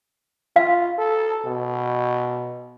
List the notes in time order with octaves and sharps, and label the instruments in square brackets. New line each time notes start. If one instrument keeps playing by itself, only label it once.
[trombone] F4 [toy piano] F5
[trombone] A4
B2